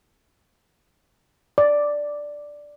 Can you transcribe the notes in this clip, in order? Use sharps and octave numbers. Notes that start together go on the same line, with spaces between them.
D5